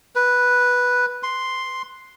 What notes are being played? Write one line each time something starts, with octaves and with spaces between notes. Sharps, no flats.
B4
C6